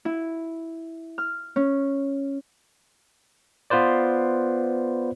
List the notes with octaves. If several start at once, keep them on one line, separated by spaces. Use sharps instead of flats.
E4
F6
C#4
B3 F4 B4 C5 D5